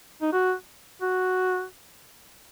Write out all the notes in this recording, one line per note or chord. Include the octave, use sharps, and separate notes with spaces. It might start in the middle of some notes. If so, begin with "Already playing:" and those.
D#4
F#4
F#4